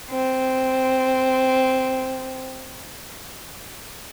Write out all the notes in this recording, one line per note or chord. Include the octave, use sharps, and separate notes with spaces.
C4